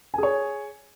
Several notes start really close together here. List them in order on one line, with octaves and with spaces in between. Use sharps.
G#5 G#4 C#5